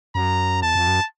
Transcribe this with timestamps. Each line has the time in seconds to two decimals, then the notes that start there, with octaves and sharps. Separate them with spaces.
0.15 F#2 A#5
0.63 E2 A5
0.75 F2
0.88 F#2